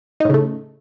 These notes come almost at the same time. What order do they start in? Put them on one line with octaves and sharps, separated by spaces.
D#4 A2 C#3 A3